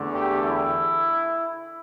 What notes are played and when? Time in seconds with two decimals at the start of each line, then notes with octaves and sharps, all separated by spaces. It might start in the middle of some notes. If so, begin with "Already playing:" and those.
Already playing: E2 D3 A3
0.14 G4
0.43 E4